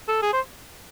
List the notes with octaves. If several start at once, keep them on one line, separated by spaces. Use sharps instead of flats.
A4
G#4
C5